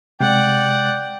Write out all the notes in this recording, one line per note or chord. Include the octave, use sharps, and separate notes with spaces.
C3 G#3 D5 F#5 G5